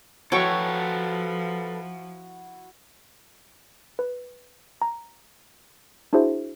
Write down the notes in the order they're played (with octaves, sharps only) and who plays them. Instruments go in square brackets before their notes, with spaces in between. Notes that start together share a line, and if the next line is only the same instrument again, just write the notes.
[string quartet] F3 [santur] E4 F#4 [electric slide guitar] A4 B4 [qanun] C#5 G5 C#6
[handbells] B4
A#5
D4 E4 F#4 G#4 C5 E5